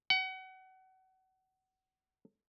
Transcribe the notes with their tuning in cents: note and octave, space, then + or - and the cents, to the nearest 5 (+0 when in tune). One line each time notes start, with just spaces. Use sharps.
F#5 +30